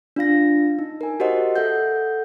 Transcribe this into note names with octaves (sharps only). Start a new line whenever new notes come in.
D4 F4 F5 A#6
D#4
A#4 G#5
F#4 G4 A#4 C5 D#5 F#5
A4 E5 F#5 G6